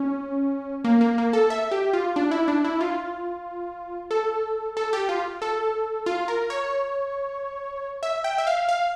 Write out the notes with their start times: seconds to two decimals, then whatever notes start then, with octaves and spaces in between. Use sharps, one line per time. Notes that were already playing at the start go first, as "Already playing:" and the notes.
Already playing: C#4
0.84 A#3
1.01 A#3
1.18 A#3
1.33 A4
1.50 E5
1.71 G4
1.93 F4
2.16 D4
2.31 E4
2.48 D4
2.64 E4
2.81 F4
4.11 A4
4.77 A4
4.93 G4
5.09 F4
5.42 A4
6.06 F4
6.28 A#4
6.50 C#5
8.03 E5
8.24 G5
8.38 E5
8.47 F5
8.69 F5